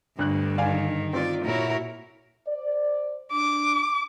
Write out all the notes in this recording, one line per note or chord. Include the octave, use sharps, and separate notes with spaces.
D2 G2 D3 F#6
D#3 D5 F5 G#5
C4 F4 D5
A#2 E4 F#4 A#4 C#5
C5 D5
D4 D6